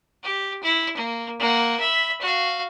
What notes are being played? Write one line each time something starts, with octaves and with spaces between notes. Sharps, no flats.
G4
E4
A#3
A#3 F#5
E5 B5
F#4 F5